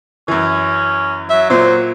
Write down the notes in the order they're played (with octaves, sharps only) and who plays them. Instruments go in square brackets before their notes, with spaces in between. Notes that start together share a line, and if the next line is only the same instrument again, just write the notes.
[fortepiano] F#2 E3 [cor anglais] C#4
[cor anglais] F#3 [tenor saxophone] E5
[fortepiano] A#2 [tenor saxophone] C5